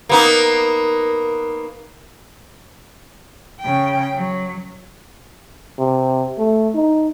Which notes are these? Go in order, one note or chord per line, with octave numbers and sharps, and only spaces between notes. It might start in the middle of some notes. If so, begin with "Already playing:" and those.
A#3 B3 D#4
C#3 G5
F#3
C3
A3
D#4